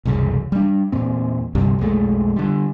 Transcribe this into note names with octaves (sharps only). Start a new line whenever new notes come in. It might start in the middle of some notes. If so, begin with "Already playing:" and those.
E1 C2 F#2 C#3
G3 D4
E2 A#2 C4
D2 G2 C3 G3
B1 F2 G#3 A3
D3 G3